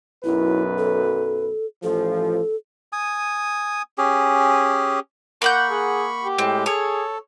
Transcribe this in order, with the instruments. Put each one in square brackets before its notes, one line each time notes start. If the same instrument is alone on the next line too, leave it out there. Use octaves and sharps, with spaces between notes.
[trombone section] B1 F#2 B4 [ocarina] E4
[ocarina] A4
[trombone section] A1 F3 [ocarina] A4
[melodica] G#5 D#6
C#4 G4 G#4
[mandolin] A#3 F#5 G6 [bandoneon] B5 C#6
[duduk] G#4
G4
[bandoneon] A2 G#3 [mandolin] C4
[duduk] G#4 [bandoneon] A4 [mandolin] C#5